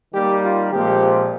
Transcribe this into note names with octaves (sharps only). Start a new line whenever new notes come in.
D#3 G3 A#3 G4
F4
A#2 F3 G#3 C4 G4